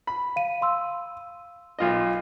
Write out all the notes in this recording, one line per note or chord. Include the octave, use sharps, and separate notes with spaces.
B5
F5 D#7
F5 C6 E6
B1 F4 D#5